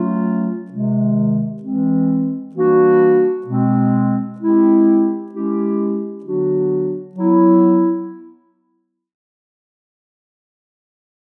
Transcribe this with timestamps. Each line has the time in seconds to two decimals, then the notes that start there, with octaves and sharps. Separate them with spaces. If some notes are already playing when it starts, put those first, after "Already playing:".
Already playing: F#3 A3 C#4 F4
0.70 C3 D#3 G#3
1.62 E3 G#3 C4
2.54 E3 G3 A#3 D4 F#4
3.47 B2 G#3 C4
4.39 G#3 C4 E4 G4
5.31 G#3 C#4 E4 G4
6.24 D3 F#3 B3 D4 F#4
7.16 F#3 B3 E4